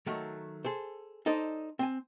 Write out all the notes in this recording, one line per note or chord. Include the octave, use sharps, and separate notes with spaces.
D#3 F#3 A3
G#4 A4 C5
D#4 A4 C5 D5 D#5
C4 G#5